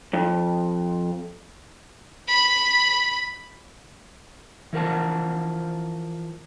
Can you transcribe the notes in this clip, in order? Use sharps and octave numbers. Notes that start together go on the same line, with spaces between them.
F2
B5
E3 F3 A#4 F#5 A5